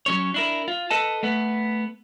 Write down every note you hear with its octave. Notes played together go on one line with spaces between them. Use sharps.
F#3 C#4 C#5
D4 E4 A#4
F4
A4 B4 D#5 A5
A3 B3 B4